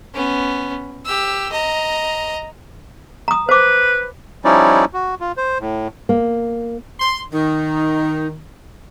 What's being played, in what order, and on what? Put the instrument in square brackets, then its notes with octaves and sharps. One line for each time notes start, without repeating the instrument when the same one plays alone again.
[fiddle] B3 C#4
G4 E6
D#5 A#5
[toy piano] A#5 D#6
[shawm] B4 [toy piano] C5 D6
[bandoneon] F3 G3 C#4 D#4 E4 D5
F#4
F4
C5
A2
[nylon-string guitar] A#3
[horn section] C6
[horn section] D#3 [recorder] D#4